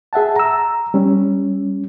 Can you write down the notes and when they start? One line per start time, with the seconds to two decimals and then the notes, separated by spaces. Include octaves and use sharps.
0.13 G#4 E5 F#5 A5
0.36 A#5 E6
0.94 G3 C#4